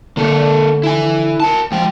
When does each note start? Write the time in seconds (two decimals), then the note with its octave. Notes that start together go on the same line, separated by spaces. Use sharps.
0.17 D3 A#3 A4
0.83 E4 G#5
1.40 A#4 A5
1.72 F3 G#3 G5